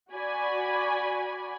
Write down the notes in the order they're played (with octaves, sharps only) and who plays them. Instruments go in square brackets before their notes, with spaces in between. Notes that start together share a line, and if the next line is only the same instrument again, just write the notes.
[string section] F#4 D5 G#5 B5